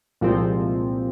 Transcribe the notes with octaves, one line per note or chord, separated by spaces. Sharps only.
C2 A#2 F3 G#3 C4